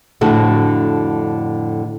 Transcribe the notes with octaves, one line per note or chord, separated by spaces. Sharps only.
F2 A2 D3 F#4 A4